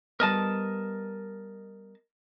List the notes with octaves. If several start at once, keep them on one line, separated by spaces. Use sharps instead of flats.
G3 B3 A#4 D#5 A5